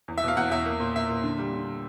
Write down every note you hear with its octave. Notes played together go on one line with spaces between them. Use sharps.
E2
E5
B2 F5
E2 F#5
E2 E5
A#3
A#2
A#3 E5
A#2
D3
G3
D3